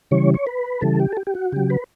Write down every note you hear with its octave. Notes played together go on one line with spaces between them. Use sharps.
C#3 E3 G3 C#5
C#5
B4
C#3 E3 G3 A4
G4
A4
G4
G4
F#4
C#3 F#3 G4
B4